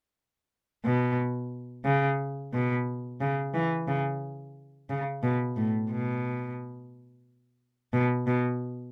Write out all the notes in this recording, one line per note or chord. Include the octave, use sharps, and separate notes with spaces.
B2
C#3
B2
C#3
E3
C#3
C#3
B2
A2
B2
B2
B2